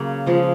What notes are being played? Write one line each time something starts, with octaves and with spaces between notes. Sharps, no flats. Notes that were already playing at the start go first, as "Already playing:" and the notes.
Already playing: C#3 F#3 A#3
C#3 F3 G#3